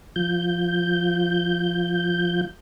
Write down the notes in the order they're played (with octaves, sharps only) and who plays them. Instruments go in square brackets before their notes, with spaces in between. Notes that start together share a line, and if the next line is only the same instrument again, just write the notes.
[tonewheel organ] F3 G6